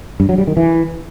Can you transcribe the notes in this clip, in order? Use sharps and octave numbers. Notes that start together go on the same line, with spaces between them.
G2
F#3
G3
D#3
E3